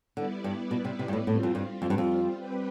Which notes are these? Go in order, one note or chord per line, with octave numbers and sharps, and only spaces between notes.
D3 G3 B3 E4 B4 D5
G2
B2
C3
C3
G2
A2
A2 G3 C4 F4
F2
G2
F2
G2
F2
G3 C4 G4 B4